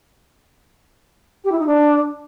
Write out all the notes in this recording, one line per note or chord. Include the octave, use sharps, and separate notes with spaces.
G4
E4
D#4
D4